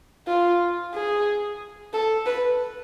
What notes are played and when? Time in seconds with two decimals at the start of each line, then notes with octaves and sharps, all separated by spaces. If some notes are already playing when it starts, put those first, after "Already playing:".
0.28 F4
0.95 G#4
1.93 A4
2.26 B4